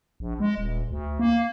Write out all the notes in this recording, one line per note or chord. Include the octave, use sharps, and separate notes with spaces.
A#1
G#3
D#1
D2
A#3